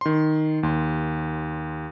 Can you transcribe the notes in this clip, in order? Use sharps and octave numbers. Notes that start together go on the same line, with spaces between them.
D#3 C6
D#2 C6